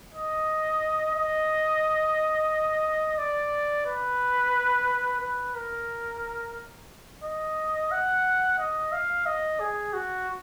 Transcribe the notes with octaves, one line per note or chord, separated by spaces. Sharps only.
D#5
D#5
D5
B4
B4
A#4
D#5
F#5
D#5
F5
D#5
G#4
F#4